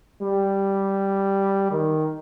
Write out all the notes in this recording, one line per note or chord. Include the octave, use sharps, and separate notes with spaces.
G3
D#3